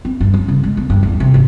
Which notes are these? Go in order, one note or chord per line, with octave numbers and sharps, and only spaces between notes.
C4
G2
F#3
C#3
G#3
B3
G2
E2
C3
G#1